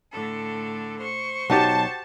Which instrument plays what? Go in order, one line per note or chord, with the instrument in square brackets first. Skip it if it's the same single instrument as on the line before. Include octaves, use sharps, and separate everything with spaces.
[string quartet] A2 D3 A4
C5 C#6
[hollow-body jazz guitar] B1 D#4 [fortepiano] F#4 G4 [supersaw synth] A5